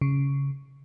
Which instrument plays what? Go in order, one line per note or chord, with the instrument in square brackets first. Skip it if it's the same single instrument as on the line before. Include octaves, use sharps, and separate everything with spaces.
[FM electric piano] C#3